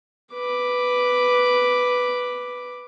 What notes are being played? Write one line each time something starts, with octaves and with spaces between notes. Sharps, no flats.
B4 D6